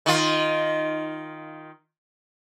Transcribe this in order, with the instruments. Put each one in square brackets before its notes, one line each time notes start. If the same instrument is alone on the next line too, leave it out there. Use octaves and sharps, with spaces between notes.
[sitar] D#3 F4